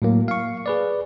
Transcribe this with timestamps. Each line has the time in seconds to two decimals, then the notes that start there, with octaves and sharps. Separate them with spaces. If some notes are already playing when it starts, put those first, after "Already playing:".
0.02 A2 F#3 A#3
0.28 F5 C#6
0.66 G#4 B4 D5